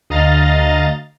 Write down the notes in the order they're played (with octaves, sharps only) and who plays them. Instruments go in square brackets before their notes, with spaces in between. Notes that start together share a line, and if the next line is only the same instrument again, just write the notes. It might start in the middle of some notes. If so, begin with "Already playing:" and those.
[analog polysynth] D2 D#5 F5 A#5 A6